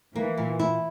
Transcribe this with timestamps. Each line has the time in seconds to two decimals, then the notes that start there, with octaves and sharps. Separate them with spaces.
0.15 E3 A#3
0.38 A#2
0.60 E4